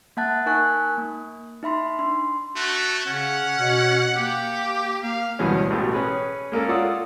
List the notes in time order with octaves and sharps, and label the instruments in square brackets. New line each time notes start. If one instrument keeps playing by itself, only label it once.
[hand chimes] A#3 E5 F#5 A5 F#6 A6
D#4 A#4 G#5 C#6 F#6 G#6
A#3
D#4 E5 B5 C6
D4 C6
[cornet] A3 [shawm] F#4
[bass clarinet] C#3 [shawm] C#4 [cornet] F#5
[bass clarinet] B2
[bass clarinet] A#3 [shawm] G4
[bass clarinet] A#3 [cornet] F5
[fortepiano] D2 G2 B2 E3 G#3 C#4
A1 B2 A3 G4
C#4 G#4 B4
G#3 A#3 C#4 A4
F4 D5 F#5 D#6 E6